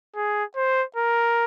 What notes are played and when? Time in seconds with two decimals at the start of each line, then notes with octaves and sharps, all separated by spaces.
0.16 G#4
0.56 C5
0.96 A#4